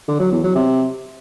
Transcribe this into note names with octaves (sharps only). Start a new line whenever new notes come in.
D3
F#3
E2
F#3
C3